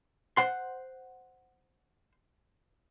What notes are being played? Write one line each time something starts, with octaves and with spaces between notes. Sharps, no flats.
C5 F#5 C6